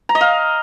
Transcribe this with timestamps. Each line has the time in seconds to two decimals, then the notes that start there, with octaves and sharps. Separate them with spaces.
0.09 A#5
0.15 D#5
0.21 F5